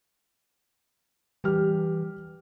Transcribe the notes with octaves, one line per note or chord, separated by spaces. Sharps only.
E3 G3 G4 F6